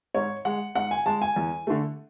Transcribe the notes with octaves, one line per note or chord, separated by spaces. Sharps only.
G#2 C#5
G#3 F#5
G#2 F#5
G#5
G#3 A5
G#5
E2
D3 A3